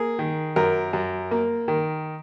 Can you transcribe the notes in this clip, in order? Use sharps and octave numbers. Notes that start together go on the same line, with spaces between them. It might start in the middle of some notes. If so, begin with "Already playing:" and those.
Already playing: A#3 G#4
D#3
F#2 A#4
F#2
A#3
D#3